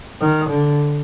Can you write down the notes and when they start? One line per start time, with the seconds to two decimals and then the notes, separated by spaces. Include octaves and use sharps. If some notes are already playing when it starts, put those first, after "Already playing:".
0.21 D#3
0.49 D3